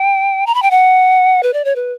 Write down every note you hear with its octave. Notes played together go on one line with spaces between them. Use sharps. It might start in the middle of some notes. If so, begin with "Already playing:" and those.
Already playing: G5
A#5
B5
G5
F#5
B4
D5
C#5
B4